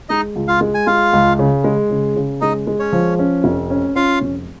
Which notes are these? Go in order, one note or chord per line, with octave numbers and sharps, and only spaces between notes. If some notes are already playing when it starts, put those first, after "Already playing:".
G#3 D#4 D#5
C#2
F4 F5
G#3
G#5
G#3 F4 F5
C#2
C#3
G#3
C#3
C#3
G#3 D#4 D#5
G#3
C#4 C#5
F3
C#4
F1
C#4
C#4 F4 F5
F1